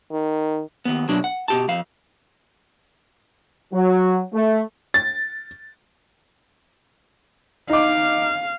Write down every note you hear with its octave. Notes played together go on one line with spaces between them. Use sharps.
D#3
D#2 B3
B2 F#3 D4
F#5
B2 G4 A5
F2 F5
F#3
A3
A6
D#4 F5 D6